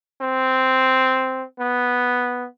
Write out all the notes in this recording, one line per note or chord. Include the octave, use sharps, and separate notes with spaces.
C4
B3